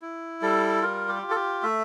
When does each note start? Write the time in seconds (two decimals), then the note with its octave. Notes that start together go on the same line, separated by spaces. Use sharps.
0.02 E4
0.42 G3 A4
0.82 F4 A#4
1.08 G4
1.22 F4
1.30 A4
1.36 G4
1.63 A3 E5